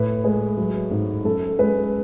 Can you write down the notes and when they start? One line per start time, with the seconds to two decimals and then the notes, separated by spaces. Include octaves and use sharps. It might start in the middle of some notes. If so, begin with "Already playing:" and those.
Already playing: A2 B4
0.24 G#3 B4
0.58 F#3
0.91 G#2
1.25 F#2 A4
1.59 G#3 B4